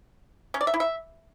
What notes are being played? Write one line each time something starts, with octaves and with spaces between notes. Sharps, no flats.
C#4
D5
E5
E4
E5